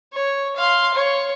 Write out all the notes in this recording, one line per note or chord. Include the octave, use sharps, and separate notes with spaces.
C#5
F5 C6
C#5